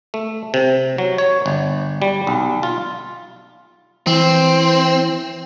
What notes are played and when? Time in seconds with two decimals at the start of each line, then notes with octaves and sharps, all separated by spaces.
0.14 A3
0.54 C3
0.98 F#3
1.18 C#5
1.46 G1
2.02 G3
2.27 B1
2.63 F4
4.07 E3 C4